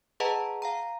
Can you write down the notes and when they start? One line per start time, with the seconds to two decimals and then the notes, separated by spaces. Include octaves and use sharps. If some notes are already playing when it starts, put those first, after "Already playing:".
0.20 G#4 B4 D#5 F#5 A5 A#5
0.62 F5 G5 A#5